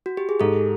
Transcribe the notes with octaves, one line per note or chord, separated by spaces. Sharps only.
F#4
G4
G#4
G#2 G4 A4